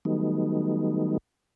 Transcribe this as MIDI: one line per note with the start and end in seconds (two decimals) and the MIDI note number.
0.05 1.18 51
0.05 1.18 54
0.05 1.18 55
0.05 1.18 57
0.05 1.18 59
0.05 1.18 63